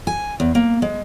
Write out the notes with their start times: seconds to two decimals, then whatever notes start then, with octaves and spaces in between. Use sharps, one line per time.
0.07 G#5
0.40 E2
0.55 A#3
0.82 G#3